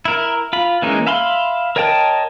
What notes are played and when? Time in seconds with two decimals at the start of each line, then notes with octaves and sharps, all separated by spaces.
0.05 E4 A#4
0.53 F4 B5
0.82 E3 G#3 A#3 C#4 D#4
1.07 E5 F5 B5 C6
1.76 A#4 C#5 D#5 G5 A5